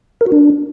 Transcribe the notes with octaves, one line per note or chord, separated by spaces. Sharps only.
A#4
F#4
D4